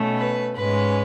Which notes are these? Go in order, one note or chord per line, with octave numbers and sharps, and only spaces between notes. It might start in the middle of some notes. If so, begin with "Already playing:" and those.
Already playing: B2 A3 C#4
B4
G#2 G#3 C#4 B4